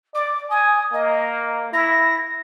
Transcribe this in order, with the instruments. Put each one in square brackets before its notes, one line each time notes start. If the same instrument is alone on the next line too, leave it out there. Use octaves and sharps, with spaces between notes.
[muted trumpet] D5 [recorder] D6
[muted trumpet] G#5 [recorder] D#6
[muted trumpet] A#3 [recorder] D#5
[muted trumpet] E4 [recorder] A#6